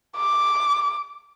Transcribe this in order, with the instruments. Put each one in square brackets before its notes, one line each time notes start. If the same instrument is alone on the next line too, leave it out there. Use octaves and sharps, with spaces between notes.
[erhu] D6